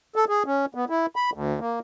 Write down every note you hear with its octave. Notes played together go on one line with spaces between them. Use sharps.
A4
G#4
C#4
B3
E4
B5
D2
A#3